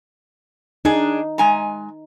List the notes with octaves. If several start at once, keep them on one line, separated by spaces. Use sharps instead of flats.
D4 D#4 G#4
G#3 G#5 A#5